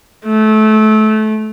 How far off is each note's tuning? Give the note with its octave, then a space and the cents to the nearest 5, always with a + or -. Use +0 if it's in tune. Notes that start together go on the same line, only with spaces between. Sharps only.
A3 -25